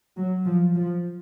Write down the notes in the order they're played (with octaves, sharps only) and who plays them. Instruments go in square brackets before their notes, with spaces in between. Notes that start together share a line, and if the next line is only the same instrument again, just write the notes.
[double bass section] F#3
F3
F3